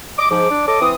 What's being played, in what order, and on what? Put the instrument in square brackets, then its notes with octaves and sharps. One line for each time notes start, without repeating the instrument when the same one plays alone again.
[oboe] D#5 [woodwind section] D6
[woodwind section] G#2 F3 [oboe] D6
[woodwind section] D4
[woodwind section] A4 C#5 D#5 [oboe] D6
[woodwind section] E3 C4 D#6